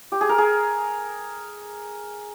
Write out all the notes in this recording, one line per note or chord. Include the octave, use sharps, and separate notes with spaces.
G4
G#4
A#4
G#4